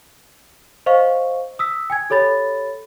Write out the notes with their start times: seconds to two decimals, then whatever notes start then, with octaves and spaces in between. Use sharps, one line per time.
0.86 C5 D#5 F5 C#6
1.59 D#6 E6 B6
1.90 G5 G#5 G#6
2.10 G4 A4 C#5 B5 A6